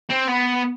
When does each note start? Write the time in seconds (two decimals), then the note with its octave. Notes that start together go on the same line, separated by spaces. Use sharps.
0.10 C4
0.28 B3